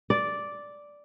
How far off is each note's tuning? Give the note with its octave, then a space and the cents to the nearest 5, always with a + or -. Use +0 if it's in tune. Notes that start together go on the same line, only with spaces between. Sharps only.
D5 -5